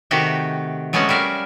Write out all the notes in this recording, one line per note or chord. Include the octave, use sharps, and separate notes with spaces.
C3 D#3 A3 F#4 G4 G5
F#3 G#3 A3 B3 C#4 F#4
G3 A#4 E5 F5